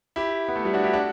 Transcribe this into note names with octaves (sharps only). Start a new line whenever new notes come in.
E4 G4
B3
A3
G3 B3
D4 F#4
E4 G4
D4 F#4